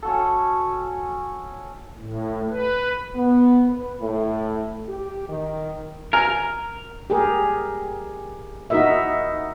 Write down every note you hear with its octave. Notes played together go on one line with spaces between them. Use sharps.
C#4 F#4 A4
A2
B4
B3
B4
A2
G4
D#3
A#4 G#5 A#5 F6
G4 G#4 A#4
D#4 E4 F#4 A#4 D#5 E5